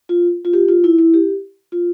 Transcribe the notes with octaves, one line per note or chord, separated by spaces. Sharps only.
F4
F4
G4
F4
E4
E4
G4
F4